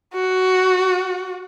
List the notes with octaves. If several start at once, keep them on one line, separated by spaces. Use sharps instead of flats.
F#4